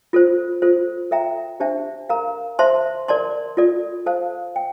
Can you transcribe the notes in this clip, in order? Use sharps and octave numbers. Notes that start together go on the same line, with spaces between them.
F4 A4 C5
F4 A4 C5
A4 E5 G5 A#5
D4 G4 C5 E5 A5
A#4 F5 A#5
C5 E5 A5 C6
A#4 D5 A5 C6
F4 A4 D5
A4 C5 F5 A5
G5